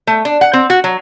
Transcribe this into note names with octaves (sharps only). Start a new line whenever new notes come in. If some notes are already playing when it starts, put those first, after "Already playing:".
A3
D4
F#5
C4
F#4
F#3